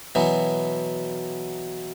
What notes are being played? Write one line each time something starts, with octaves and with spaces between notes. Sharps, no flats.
B2 E3 F#3 B3